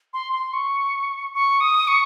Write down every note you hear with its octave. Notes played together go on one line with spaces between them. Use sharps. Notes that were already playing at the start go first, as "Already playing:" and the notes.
C6
C6
C#6
C#6
D#6
C#6